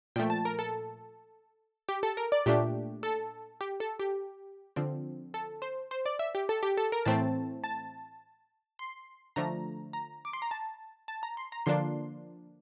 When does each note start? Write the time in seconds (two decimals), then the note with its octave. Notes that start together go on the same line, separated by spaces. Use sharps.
0.16 A#2 F3 A3 G5
0.30 A5
0.45 A#4
0.59 A4
1.89 G4
2.03 A4
2.17 A#4
2.32 D5
2.46 A#2 A3 D4 G4
3.03 A4
3.61 G4
3.80 A4
3.99 G4
4.76 D3 F3 C4
5.34 A4
5.62 C5
5.91 C5
6.06 D5
6.19 E5
6.35 G4
6.49 A4
6.63 G4
6.77 A4
6.92 A#4
7.05 A2 E3 A3 C4 A5
7.64 A5
8.79 C6
9.36 D3 F3 A3 A#5
9.93 A#5
10.25 D6
10.33 C6
10.42 A#5
10.51 A5
11.08 A5
11.23 A#5
11.37 C6
11.52 A#5
11.66 D3 F3 A#3 D4 C6